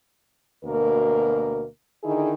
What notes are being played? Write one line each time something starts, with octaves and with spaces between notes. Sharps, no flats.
D2 B2 A#3 A#4
D3 D#3 D#4 E4 G#4